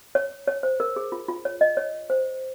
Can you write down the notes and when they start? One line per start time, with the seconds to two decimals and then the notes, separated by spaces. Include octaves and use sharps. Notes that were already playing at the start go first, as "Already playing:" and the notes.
0.15 C#5
0.47 C#5
0.63 C5
0.80 A#4
0.96 G#4
1.12 F4
1.29 F4
1.45 C#5
1.61 D#5
1.77 C#5
2.10 C5